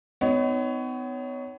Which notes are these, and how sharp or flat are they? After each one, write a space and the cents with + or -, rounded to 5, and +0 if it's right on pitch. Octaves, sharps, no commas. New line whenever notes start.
B3 +35 D#4 +0 C#5 +15